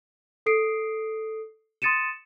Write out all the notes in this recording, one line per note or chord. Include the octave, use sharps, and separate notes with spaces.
A4 D#6 C7 D7
C6 D#6 A6 C#7 D#7 E7